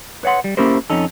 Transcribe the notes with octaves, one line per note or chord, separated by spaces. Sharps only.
B4 C#5 F5 F#5 C6
G3
A#3 C#4 E4 G4 A#4 C5
F2 C#4 D#4 A4